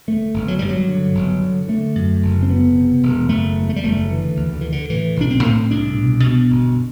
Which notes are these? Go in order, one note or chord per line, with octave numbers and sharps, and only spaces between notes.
G1 A3
G1
F#3
G2 G3
F#3
D3
G1
D3
D3 A3
F#2
F#1
C4
D2 B3
C3
E1
F#1 A3
E2
A3
G3
F#1 A3
F#3
D3 E3
D2
D3
D3 E3
D3
A2 E3
B1 D4
C4
A2
C2 D4
B2
B2
G1